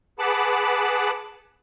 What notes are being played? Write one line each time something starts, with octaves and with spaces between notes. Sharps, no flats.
G#4 B4 F#5 A5 B5 D6